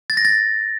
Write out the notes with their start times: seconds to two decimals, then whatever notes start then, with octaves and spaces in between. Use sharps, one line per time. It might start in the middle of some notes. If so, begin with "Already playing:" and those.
0.10 A6
0.17 A#6
0.25 A6